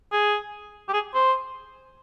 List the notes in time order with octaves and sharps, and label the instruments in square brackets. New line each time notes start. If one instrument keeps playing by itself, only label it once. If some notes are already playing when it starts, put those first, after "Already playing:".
[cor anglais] G#4
G4
G#4
C5